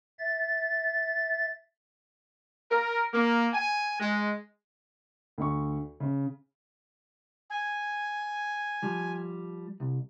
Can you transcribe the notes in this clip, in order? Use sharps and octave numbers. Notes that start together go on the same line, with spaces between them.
E5 A6
A#4
A#3
G#5
G#3
D2 C#6
C#3
G#5
F3 G3
C2